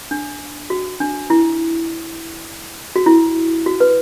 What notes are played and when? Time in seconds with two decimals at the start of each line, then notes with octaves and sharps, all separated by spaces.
0.11 D4
0.70 F#4
1.00 D4
1.30 E4
2.96 F#4
3.06 E4
3.66 F#4
3.80 B4